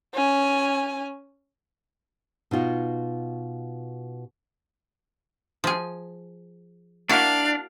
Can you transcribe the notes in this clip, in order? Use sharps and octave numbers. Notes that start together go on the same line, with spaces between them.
C#4 G#5
B2 D#4 F4 F#4
F3 G#4
A#3 D4 E4 F#4 F5